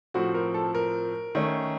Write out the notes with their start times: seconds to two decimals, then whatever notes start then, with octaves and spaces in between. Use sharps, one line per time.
0.14 A2 F3 C4 F#4
0.34 A#4
0.54 A4
0.75 A#4
1.35 D#3 A3 C#4